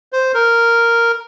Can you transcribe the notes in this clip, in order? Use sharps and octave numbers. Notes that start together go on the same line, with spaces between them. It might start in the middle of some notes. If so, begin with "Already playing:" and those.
C5
A#4